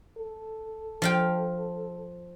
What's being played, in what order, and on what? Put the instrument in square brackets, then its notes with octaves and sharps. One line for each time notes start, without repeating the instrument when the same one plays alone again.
[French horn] A4
[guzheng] F3 F5 G5